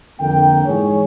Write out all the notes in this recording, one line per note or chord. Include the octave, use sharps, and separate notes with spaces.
F2 D3 A#3 A#4 G5
G#2 E3 G#4 C#5